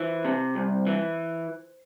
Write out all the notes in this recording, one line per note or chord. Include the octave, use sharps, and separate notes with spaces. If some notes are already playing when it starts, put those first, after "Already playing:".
Already playing: E3 C5
C3
C2
E3